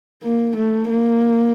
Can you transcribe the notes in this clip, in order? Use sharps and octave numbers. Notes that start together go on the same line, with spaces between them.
A#3
A3
A#3